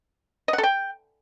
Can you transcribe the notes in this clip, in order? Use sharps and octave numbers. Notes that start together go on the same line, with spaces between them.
D#5
F#5
A4
G5